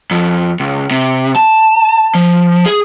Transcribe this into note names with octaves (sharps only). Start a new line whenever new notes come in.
F2
C#2
C3
A5
F3
G#4